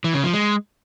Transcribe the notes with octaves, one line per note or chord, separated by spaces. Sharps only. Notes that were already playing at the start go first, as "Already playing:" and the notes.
E3
C#3
F3
G#3